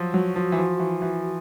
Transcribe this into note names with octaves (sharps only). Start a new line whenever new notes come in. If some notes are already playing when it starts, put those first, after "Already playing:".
Already playing: F3 F#3
F#3 F#4
F3
E3
F3
E3
E3